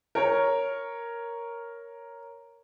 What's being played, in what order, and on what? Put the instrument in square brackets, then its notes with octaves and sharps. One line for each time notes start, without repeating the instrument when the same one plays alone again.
[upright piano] A#4 C#5